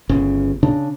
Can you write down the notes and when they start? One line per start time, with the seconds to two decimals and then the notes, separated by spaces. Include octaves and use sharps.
0.09 G1 C#3
0.63 C#3 D4